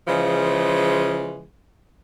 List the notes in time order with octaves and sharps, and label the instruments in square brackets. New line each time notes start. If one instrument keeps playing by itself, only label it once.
[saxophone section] C#3 E3 F3 G#3